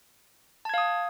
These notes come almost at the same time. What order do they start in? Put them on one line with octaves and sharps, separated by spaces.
A5 G#6 F5 D#6